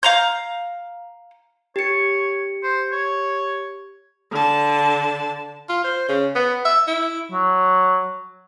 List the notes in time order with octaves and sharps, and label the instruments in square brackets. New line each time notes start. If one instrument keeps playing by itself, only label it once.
[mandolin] F5 A#5 G6
[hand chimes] G4 C#7 [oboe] C#5
[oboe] C5
C#5
[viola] D3 A5
[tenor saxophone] F4
C5
C#3
B3
E5
E4
[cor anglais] F#3